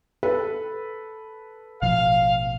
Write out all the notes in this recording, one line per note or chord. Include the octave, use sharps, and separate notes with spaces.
A4 B4
A1 B2 F3 F5